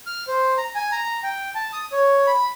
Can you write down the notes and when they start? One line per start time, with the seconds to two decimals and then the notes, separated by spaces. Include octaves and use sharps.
0.06 F6
0.28 C5
0.58 A#5
0.75 G#5
0.92 A#5
1.23 G5
1.55 A5
1.73 D#6
1.92 C#5
2.27 B5